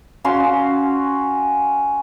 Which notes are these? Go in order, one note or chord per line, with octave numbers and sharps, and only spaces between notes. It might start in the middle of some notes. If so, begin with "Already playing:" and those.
C#4 F#4 F5 C6